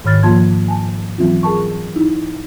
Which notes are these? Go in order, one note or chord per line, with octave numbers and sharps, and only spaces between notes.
G#2 D#3 C#5 B5 F6 A6
F3 A#3 F4 A5 C6 G#6
G#5 A5
E3 F#3 C4 C#4 F4
G#4 A#4 A5 C#6
D#4 E4